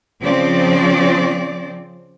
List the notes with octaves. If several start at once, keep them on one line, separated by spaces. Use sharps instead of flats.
C#3 F3 C4 D5